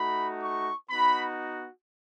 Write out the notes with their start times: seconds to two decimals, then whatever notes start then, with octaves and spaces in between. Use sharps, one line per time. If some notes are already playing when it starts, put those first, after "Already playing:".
Already playing: A3 D#4 F#4 B5
0.41 C#6
0.90 B3 D#4 F#4 B5